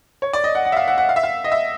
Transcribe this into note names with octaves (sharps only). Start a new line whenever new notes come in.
C#5
D5
D#5
F#5
F#5
E5
F5
F#5
F#5
F5
E5
F5
D#5
E5